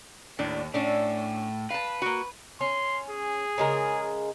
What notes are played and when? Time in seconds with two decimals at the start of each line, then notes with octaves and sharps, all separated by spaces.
0.39 D#2 A2 D4
0.74 A2 C#4 D4
1.70 B4 F5 A5
2.02 A#3 F#4
2.61 C#4 C6
3.09 G#4
3.58 C#3 G#3 A#4